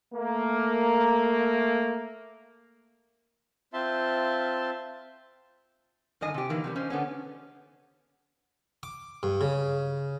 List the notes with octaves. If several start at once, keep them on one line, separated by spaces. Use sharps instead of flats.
A3 A#3
C4 F4 E5 A5 C6
G2 D3 D#3 D#5 G#5
C3 G4
D#3 E3 A#3
C3 E3 G3
C#4 C5 D#5
D3 B3 C#4
D6
G2
C#3